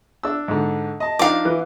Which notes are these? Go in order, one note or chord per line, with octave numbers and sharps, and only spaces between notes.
D4 E6
G#2 D3
D#5 A5
F3 D4 D#4 F5 D6
E3